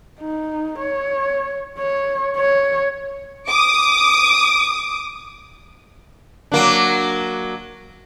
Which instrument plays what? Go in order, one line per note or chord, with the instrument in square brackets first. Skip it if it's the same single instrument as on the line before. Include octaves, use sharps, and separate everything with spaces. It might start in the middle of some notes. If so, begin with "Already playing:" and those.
[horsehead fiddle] D#4
C#5
C#5
C#5
[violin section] D6 D#6
[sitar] F#3 A#3 D4